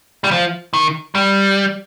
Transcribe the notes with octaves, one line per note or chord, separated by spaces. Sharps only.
G3
F3
D#3
G3